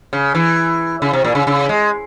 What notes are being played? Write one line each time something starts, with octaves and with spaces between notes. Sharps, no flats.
C#3
E3
C#3
C3
A#2
C#3
C#3
G#3